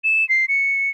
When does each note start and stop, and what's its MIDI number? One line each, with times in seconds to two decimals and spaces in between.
0.04 0.27 100
0.29 0.45 96
0.48 0.90 97